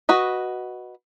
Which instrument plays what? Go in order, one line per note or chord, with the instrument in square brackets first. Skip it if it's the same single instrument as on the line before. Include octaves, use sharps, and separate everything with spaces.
[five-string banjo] F#4 B4 D#5